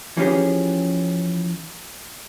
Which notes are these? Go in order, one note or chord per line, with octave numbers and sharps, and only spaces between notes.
E3 F3 C#4 G4 G#4